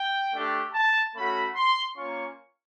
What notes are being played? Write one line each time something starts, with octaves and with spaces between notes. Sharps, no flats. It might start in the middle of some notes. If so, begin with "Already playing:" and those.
Already playing: G5
A3 D4 G4
A5
A3 C#4 F#4 B5
C6
A#3 C#4 F4 C#6